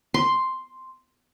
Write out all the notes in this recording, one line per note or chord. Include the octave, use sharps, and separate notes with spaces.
C6